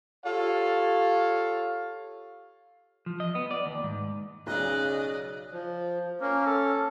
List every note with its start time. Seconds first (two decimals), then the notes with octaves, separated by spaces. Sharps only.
0.25 F4 G4 A4 C#5 F5
3.06 F3
3.20 D#5
3.35 B3
3.51 D5
3.66 D#2
3.83 G#2
4.47 B1 C#3 D5 D#5 F#6
5.52 F3
6.21 A#3 C#4
6.46 A4